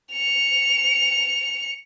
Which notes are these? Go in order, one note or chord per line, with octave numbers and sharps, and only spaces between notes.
C#7 F7